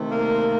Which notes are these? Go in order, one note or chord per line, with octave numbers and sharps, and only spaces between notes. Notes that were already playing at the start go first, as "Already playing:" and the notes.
Already playing: C3 D#3 A3
A#3